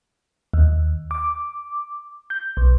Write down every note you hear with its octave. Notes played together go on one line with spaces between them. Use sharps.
D#2
D6
G6
B1